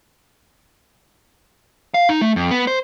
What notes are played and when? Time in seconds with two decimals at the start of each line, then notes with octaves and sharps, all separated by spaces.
1.94 F5
2.09 D#4
2.21 A3
2.36 F2
2.51 B3
2.67 C5